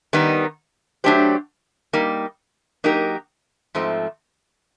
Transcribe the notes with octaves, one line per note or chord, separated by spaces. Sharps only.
D#3 G3 B3 D#4
F#3 A3 D4 G4 C5
G3 A#3 D#4
F#3 A#3 D#4 G4 A#4
G#2 F3 A3 C4